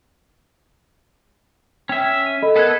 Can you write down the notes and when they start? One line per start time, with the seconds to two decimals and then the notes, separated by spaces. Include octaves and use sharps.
1.89 C#4 E5 G5
2.26 D#7
2.43 A4 D#5 B5
2.56 B3 A4 A#4 F#6 G#6